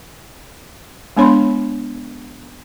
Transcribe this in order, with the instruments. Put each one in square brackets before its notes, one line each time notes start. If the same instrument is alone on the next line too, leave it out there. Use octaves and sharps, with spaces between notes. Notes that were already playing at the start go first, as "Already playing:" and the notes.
[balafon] G#3 B3 D4 C#5 B5 C6